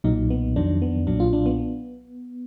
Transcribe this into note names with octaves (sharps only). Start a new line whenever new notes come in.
B1 A#2 F#3 D#4
B3
F2 D#3 F#3 D4
B3
B1 A#2 F#3 D4
F4
D4
B3